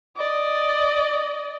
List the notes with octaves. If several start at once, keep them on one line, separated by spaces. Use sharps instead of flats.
D5 D#5